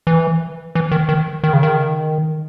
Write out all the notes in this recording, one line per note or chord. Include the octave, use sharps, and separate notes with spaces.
E3
E3
D#3
D#3
D#3
C#3
D#3